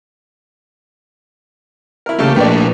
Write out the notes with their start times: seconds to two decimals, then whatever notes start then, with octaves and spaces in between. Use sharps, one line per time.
2.06 E4 A#4
2.19 A1 C#3 A3 A#3 G4 A4
2.36 A#1 A#2 A3 G4 B4 D5